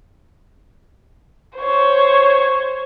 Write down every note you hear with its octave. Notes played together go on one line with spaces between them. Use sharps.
C5 C#5